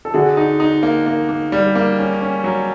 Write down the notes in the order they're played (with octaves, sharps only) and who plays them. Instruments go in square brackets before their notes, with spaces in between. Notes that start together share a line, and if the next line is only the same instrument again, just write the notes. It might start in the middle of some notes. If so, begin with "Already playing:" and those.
[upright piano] A4
[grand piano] D3 [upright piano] F#4 G#4
[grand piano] D#4
D#4
A#3
A#3
A#3
G3
A#3
C#4
C#4
F#3